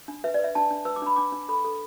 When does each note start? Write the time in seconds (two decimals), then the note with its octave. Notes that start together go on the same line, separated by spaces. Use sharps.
0.08 D4
0.24 B4 E5
0.34 D5
0.39 B4
0.44 E5
0.55 D4 A5
0.71 D4
0.85 B4 E6
0.96 D6
1.02 D4 B5
1.16 D4 D6
1.32 D4
1.49 A4 B5
1.65 A4